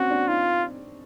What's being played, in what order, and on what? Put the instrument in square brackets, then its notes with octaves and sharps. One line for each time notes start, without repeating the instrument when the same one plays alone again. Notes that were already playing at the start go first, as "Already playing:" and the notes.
Already playing: [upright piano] C4 C#4 [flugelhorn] F#4
[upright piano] D4
[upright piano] D#4 [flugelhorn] F4